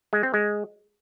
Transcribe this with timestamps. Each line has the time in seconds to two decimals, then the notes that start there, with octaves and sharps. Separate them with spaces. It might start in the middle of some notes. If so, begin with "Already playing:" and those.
0.13 G#3
0.23 C4
0.34 G#3